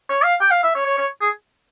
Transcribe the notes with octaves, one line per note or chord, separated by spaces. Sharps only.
C#5
F5
G5
F5
E5
C#5
C#5
C#5
G#4